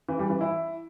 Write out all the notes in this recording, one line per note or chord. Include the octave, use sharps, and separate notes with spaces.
E3
G3
E3
E4